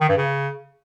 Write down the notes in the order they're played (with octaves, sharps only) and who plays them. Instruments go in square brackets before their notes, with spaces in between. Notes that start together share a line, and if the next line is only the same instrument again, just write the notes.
[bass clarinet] D#3
G2
C#3